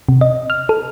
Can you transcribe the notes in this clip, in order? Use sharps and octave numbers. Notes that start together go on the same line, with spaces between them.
C3
D#5
F6
A4